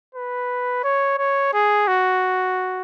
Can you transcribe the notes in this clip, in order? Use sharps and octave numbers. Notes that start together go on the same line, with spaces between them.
B4
C#5
C#5
G#4
F#4